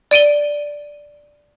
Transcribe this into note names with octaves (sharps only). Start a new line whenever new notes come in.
D5 D7 D#7 G7